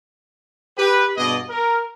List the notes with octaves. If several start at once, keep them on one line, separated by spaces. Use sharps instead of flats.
G4 B4
G2 B2 B3 G#4 D5 D#5
A#4